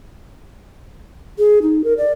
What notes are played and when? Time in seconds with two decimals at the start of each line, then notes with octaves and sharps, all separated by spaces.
1.39 G#4
1.62 D#4
1.84 A#4
1.98 D5